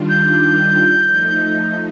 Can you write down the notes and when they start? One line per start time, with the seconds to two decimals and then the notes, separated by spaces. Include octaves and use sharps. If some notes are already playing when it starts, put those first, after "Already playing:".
Already playing: D#3 G3 D4 F4
0.09 G6
1.08 F3 A3 D#4